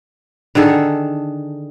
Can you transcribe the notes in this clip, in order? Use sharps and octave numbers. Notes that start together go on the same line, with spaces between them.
D3 D#3 G#4 A4